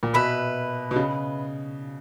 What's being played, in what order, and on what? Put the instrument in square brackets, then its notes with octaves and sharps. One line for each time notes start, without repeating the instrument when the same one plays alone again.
[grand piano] A#2
[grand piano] B2 [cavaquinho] B4 E5 B5
[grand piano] B2
C#3